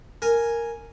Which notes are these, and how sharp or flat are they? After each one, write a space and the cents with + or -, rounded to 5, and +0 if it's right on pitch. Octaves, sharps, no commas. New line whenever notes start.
A#4 -5 G#5 +0